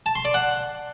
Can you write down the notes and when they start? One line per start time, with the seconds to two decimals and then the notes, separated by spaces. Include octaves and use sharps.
0.06 A5
0.15 C6
0.25 D5
0.34 F#5